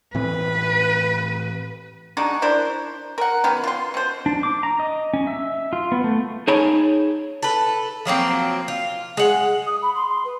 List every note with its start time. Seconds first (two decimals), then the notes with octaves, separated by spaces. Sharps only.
0.15 A2 E3 C4 B4
2.17 G#3 D4 D#4 F#4
2.42 D4 E4 A#4 C5
3.18 A#4 F#5
3.44 D#3 F#3 B3
3.64 F4 C6
3.94 B2 C5
4.26 D4
4.43 D6
4.63 A#5
4.80 D#5
5.13 C#4
5.27 E5
5.73 F4
5.92 B3
6.04 A3
6.48 D#4 G#4 C#5 G#5 A5 B5
7.43 A4 B4
8.05 F3 F#3 A#3 C4
8.68 F4
9.17 G#3 F#5
9.66 D#6
9.82 B5
9.95 C6
10.09 C6
10.24 B4